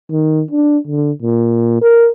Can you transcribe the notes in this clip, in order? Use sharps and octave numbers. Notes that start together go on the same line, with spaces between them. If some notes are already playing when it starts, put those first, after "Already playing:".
D#3
D4
D3
A#2
A#4